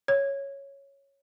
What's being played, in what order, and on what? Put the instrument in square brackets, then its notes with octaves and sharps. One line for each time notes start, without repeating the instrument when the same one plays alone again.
[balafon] C#5